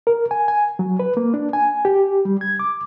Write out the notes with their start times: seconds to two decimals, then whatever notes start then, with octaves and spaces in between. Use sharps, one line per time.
0.07 A#4
0.31 G#5
0.48 G#5
0.79 F#3
0.99 B4
1.17 A#3
1.34 D4
1.53 G#5
1.85 G4
2.25 G3
2.41 G#6
2.59 D6